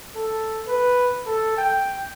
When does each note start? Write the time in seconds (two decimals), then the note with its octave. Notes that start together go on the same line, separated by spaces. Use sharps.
0.16 A4
0.67 B4
1.26 A4
1.57 G5